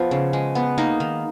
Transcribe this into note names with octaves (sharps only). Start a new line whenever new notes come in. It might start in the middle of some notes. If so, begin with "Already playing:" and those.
Already playing: F3 B3
C#3
G#3
B3
A#3 D#4
D#3